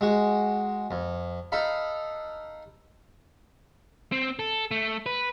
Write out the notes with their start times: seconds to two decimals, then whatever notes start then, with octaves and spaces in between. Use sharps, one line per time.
0.01 G#3 F#4
0.91 F2
1.52 D#4 A4 F5 B5
4.12 C4
4.39 A4
4.71 A3
5.06 B4